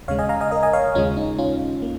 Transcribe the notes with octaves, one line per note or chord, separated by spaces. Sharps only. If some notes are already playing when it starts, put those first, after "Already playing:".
D#2 C#3 G#3 C#5 F5
D#5 G#5
F5 A#5
D#5 G#5
A#4 D#5
D#5 G#5
C#5 F5
D#2 C#3 G#3 C#4 F4
D#4
C#4 F4
A#3